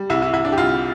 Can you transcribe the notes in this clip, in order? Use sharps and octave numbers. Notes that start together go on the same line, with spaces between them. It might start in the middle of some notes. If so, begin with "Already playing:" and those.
Already playing: G3
C2 E4
E4
C2 E4
D4
G4
C2 F4